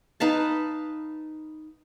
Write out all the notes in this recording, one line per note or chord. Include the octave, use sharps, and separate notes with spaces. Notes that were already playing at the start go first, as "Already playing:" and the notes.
D#4 B4 F5 A5